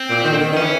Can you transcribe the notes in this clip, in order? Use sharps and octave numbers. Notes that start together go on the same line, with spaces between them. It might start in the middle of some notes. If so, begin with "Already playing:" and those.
Already playing: C4
A#2
D#3
D3
D#3
D#3
E3 C#4